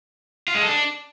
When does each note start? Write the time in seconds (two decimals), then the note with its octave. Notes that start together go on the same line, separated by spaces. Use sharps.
0.48 F4
0.55 G#3
0.62 A4
0.69 D4